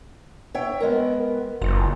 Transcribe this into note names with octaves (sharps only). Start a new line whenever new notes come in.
C#5 E5 G5
G#3 B3 A#4
F#1 F4